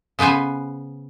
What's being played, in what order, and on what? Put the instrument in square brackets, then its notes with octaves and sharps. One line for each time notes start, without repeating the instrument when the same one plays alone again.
[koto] C#3 B3 B4 C5 G#5